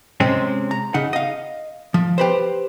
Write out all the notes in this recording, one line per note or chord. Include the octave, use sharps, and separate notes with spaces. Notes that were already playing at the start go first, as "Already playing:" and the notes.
C3 G#3 C4 C#4
A#5
C#3 D#4 F#5
D#5 F5
F3
G4 B4 C5